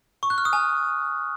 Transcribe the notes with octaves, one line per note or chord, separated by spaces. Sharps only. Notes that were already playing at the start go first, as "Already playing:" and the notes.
C#6
F#6
F6
D#6
G#5